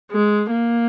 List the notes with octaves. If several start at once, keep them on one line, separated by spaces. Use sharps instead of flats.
G#3
A#3